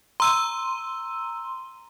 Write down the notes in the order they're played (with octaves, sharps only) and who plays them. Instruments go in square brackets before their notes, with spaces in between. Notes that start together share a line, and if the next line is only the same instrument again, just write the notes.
[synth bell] A#5 E6 D#7 [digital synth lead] C6